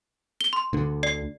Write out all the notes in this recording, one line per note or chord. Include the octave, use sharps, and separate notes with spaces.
G7
C6
D2 D3
D5 C7